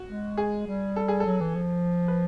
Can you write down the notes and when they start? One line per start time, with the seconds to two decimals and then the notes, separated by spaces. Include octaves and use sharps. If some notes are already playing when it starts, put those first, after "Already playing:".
Already playing: F#4
0.08 G#3
0.37 G#4
0.67 G3
0.96 A4
1.08 G#4
1.20 A4
1.26 F#3
1.41 E3
1.56 F3
2.08 B4